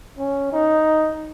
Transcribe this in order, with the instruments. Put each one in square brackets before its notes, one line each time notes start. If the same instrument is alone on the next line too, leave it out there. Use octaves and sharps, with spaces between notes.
[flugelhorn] C#4
D#4